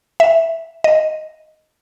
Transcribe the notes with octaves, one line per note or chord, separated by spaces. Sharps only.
E5
D#5